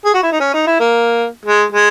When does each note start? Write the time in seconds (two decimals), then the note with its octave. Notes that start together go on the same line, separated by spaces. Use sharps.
0.05 G#4
0.14 F#4
0.23 E4
0.32 D#4
0.40 C#4
0.54 D#4
0.67 E4
0.80 A#3
1.46 G#3
1.72 G#3